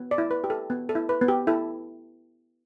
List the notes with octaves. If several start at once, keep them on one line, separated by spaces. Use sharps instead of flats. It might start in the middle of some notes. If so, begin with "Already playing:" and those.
Already playing: B3
D5
E4
B4
G4
A4
B3
A4
E4
B4
B3
G4
E4 A4